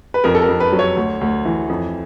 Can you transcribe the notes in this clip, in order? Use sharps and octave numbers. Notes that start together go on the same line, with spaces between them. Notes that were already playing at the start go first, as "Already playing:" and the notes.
B4
F2 A#4
A4
A#4
F2
B4
F#3
C#5
D2
D2
E3
F2